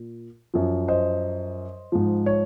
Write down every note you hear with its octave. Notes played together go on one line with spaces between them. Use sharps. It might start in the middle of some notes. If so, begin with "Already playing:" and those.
Already playing: A#2
F#2 F3
C5 D#5
G#2 F3
C#5